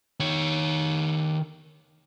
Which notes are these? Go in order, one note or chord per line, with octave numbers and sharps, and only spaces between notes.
D#3 C#5